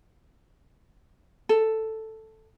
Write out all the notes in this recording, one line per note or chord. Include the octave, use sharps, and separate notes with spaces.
A4